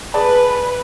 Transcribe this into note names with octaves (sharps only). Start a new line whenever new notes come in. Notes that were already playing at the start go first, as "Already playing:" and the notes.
G#4 B4 D5 A5